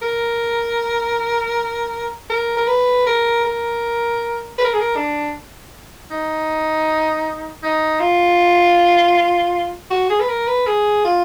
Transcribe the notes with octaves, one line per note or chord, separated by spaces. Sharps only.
A#4
A#4
A#4
B4
A#4
A#4
B4
A#4
G#4
A#4
D4
D#4
D#4
F4
F#4
G#4
B4
A#4
B4
G#4
F4